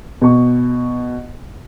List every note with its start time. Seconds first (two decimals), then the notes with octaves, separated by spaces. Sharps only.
0.22 B2 C#6